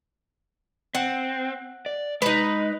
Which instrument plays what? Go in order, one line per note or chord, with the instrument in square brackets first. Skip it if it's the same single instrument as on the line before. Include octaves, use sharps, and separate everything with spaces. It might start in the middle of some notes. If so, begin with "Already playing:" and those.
[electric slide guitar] C4 [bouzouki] F#5
[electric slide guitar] D5
[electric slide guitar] G#3 [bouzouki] D#4 B4